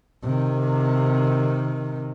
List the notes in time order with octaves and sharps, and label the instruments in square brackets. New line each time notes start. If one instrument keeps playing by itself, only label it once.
[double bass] C3 D#3